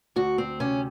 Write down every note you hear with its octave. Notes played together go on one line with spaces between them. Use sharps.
D2 F#4
C4
C3 C#4